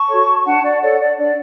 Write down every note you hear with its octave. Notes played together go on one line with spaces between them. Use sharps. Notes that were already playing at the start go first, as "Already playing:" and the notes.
Already playing: A5 C#6
F#4 A4 C#5
D4 F#5 A5
D5 F#5
A4 C#5 D5 F#5
D5
D4 D5